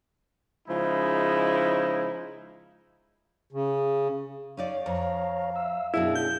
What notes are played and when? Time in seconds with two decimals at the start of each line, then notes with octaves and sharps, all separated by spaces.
0.68 C#3 F3 G#3 D#4 E4
3.52 C#3
4.57 C#4 D#4 C#5 D5 F5
4.86 F2 C#5 A#5
5.56 E5 E6
5.94 F#2 B2 D4 E4 G#4
6.16 G6